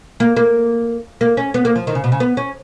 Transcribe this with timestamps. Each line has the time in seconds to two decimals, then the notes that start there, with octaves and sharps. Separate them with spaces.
0.20 A#3
0.37 A#3
1.21 A#3
1.37 C#4
1.54 B3
1.65 A#3
1.76 F3
1.87 D#3
1.95 C#3
2.04 B2
2.12 C#3
2.20 B3
2.37 C#4